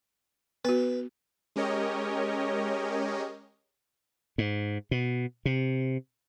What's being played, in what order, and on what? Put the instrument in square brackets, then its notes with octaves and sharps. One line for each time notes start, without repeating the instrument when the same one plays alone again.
[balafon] B3 F#4 [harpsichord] B4
[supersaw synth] G#3 C#4 G4 A#4 C#5 D#5
[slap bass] G#2
B2
C3